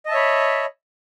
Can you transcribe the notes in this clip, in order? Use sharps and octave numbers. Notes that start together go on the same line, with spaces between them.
C#5 D#5 E5 A5 B5